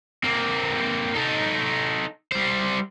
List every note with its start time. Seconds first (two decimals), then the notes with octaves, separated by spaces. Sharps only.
0.24 A#3 C4
1.15 D#4 A4
2.32 G3 C5